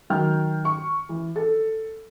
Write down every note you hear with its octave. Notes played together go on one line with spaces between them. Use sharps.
D#3 F#3 G5 F6
C#6
E3
A4